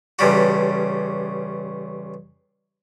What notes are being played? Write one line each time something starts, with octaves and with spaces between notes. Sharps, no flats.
A1 G2 C#3 G3 F#4